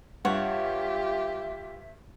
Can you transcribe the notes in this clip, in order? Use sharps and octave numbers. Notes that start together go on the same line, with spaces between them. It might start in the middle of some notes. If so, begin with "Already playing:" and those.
G2 F4 G4 C#5 E5 F#5